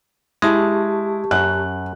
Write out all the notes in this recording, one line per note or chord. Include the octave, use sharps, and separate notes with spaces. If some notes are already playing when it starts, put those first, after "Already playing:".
G#3 E4 G4 A5 C#6
F#2 F#6